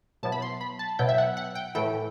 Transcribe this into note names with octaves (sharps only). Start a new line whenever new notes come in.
B2 F#3 B3 E4 A5
B5
C6
B5
A5
B2 F#3 B3 E4 G5
E5
F#5
F#5
G5
A2 E3 A3 E4 G5